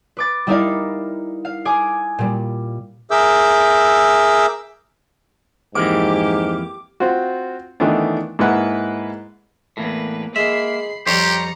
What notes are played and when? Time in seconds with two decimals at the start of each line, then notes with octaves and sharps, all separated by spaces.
0.17 B4 D6 A6
0.47 G3 D#4 E4 A#4 D5 F5
1.45 F5
1.65 G#4 G#5 D6
2.19 A#2 G3
3.11 G#4 A#4 E5 D6 E6 G6
5.75 F2 G#2 E3 A#3 G4 D6
7.00 C4 F4 F#4
7.80 D#3 E3 A3 B3 D4
8.39 G#2 A#3 E4 B4 F#5
9.77 E2 A2 A#3 B4
10.36 G#3 A#3 E5 B5 C7
11.07 F2 G3 G4 C5 C#5 A#5 C#7